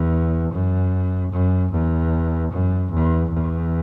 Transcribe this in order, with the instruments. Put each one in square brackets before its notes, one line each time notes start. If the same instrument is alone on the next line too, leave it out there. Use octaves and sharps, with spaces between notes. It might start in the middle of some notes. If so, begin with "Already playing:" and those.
Already playing: [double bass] E2
F#2
F#2
E2
F#2
E2
E2